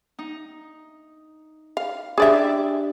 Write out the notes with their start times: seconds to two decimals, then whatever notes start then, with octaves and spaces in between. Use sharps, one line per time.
0.19 D#4
1.77 F5
2.18 D4 E4 G4 G#4 D5 E5